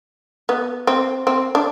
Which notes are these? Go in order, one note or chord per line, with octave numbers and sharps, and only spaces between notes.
B3
C4
C4
D4